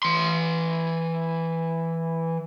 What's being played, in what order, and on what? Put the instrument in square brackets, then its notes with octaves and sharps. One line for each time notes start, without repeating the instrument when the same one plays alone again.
[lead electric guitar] E3 C6